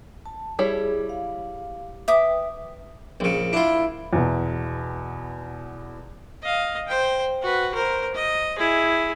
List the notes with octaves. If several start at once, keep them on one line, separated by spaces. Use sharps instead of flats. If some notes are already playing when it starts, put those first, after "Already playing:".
A5
G3 E4 G#4 C#5
F5
B4 E5 G5 D6 D#6
A#1 C#3
D4 E4 F4
E2 B2
D#5 F5
C5 G5
F#4 B4
A#4 C5
D#5
E4 G#4